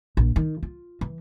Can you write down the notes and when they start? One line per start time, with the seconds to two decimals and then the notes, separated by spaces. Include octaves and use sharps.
0.17 A#1
0.36 D#3
0.63 F4
1.01 E3